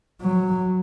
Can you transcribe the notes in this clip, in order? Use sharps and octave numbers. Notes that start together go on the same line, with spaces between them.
F#3